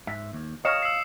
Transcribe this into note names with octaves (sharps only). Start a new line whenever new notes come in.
G#2 E5
D#2
C#5 D#5 F5 D#6 C#7 E7
E6 C7